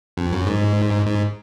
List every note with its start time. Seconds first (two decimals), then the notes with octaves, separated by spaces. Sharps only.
0.17 F2
0.32 F#2
0.47 G#2
1.06 G#2